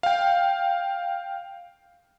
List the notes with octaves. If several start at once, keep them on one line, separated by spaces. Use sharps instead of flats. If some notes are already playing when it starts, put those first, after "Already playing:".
F5 G5